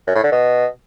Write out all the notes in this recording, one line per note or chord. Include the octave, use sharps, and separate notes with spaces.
F#2
A2
D3
B2